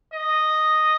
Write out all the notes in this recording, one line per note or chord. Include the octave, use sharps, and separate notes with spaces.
D#5